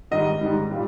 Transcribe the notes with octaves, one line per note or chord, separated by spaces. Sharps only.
G#2 D#3 G3 D#5
G#2 D#3 G3
A#2 G3